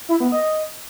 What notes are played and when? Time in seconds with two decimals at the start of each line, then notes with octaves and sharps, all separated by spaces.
0.09 E4
0.20 B3
0.32 D#5